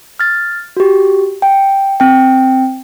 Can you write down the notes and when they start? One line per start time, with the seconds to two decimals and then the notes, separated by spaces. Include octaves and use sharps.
0.20 F6 A6
0.77 F#4 G4
1.42 G5
2.00 C4 G5